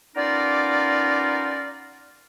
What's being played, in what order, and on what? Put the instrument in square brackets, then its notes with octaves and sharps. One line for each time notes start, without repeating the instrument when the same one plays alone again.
[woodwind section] B3 C#4 D#4 F4 A#4 D5